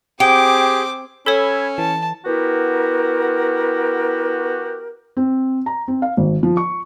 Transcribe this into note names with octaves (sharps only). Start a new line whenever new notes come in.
C4 G4 G#4 G5 D6
C#4 A4 C#5 B5 E6 G#6
E3 A5
B3 E4 F#4 G4 A#4
C4
A#5
C4
F5
G#1
F3
C#6